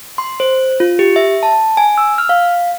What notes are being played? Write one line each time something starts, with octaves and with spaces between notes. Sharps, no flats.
C6
C5
F4
G4
E5
A5
G#5
E6
F6
F5